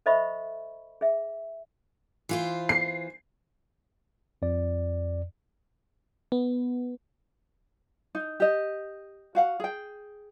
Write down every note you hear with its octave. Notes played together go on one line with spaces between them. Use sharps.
A4 C5 D#5 E5 B5 C#6
G#4 E5
E3 F4 C5
C7
F2 D5
B3
D#4
G4 D#5
F#4 F5 F#5
G#4 G5